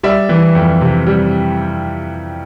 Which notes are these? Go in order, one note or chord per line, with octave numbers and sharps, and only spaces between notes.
G3 D5 E5
E3
F2
C3
G3